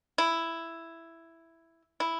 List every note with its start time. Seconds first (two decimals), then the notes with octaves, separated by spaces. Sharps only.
0.18 E4
2.00 E4